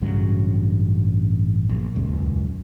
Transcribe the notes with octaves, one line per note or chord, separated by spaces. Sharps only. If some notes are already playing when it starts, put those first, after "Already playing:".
A1 G2 C#3 F#3
A#1
D#1 C#2 F#2